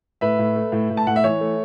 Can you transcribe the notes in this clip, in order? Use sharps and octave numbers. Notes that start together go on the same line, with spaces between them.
A2 B4 E5
A2
A3
A2
A2
A5
A2 F#5
E5
E3 C#5
A3